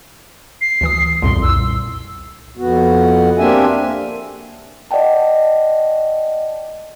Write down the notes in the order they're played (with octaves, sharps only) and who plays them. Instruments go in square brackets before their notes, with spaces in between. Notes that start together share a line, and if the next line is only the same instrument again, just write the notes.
[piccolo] C7
[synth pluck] D2 E3 D#6
[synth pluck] C2 F2 A#2 [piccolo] C6
[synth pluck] C2 [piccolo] E6
[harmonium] F2 B3 F#4
A#3 C4 D4 G4 E5 G#5
[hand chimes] D5 D#5 F#5 G5 A5